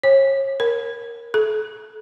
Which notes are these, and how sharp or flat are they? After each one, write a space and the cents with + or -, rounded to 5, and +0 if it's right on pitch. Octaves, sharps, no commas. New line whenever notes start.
C#5 -30
A#4 +10
A4 -30